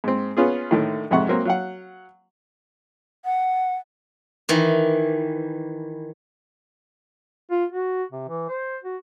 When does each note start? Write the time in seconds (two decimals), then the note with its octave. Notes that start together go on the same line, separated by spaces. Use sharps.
0.04 G#2 C4
0.37 B3 C#4 F4 G#4
0.71 A2 D3 D#3 A3
1.11 F2 G#2 C3 F#5 C#6
1.28 F#3 A#3 C4
1.45 F#3 F5 F#5
3.25 F#5
4.49 D#3 E3
7.51 F4
7.72 F#4
8.12 C3
8.28 E3
8.49 C5
8.84 F#4